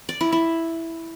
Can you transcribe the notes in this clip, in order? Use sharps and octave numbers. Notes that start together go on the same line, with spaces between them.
D5
E4
E4